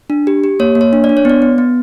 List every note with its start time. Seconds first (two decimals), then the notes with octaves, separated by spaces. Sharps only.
0.10 D4
0.27 G4
0.44 G4
0.60 A#3 C#5
0.75 A#3
0.81 C#5
0.93 D4
1.04 D5
1.09 D4
1.17 C#5
1.25 B3 D5
1.42 B3
1.58 B3